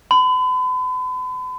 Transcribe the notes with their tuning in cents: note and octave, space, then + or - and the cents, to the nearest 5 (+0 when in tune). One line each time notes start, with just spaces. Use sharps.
B5 +40